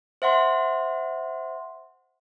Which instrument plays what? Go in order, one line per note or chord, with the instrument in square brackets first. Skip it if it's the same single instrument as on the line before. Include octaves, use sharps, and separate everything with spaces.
[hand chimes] C5 E5 F#5 C6